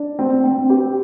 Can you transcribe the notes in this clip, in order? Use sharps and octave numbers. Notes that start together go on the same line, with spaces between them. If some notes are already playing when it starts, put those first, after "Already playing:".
Already playing: D4
C4
C4
G4